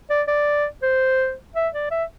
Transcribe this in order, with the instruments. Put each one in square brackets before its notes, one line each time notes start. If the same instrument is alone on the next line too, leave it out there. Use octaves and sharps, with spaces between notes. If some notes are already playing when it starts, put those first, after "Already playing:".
[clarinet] D5
D5
C5
E5
D5
E5